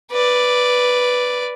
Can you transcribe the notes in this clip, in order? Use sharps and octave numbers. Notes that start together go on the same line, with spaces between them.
B4 D5